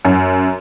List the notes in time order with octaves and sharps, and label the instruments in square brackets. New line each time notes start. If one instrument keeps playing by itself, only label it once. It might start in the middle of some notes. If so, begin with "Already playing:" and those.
[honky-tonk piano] F#2